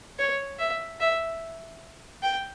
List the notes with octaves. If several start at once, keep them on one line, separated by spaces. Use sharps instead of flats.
C#5
E5
E5
G5